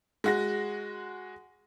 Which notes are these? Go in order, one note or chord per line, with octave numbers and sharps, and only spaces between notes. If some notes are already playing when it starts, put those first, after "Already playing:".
G#3 F#4 A#6